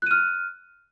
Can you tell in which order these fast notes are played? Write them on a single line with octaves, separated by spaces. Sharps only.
F#6 D#7 F6